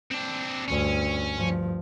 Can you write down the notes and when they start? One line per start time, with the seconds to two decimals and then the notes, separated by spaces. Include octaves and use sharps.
0.11 C4 D4
0.68 D2 G2 C#4
1.36 G2 F3